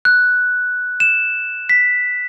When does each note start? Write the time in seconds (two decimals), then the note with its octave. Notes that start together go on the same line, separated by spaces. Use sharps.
0.05 F#6
1.00 E7
1.69 B6